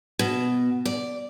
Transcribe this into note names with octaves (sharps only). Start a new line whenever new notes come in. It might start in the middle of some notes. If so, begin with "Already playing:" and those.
B2
D5